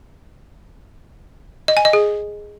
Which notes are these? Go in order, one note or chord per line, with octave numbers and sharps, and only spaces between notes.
D#5
G#5
D#5
G#4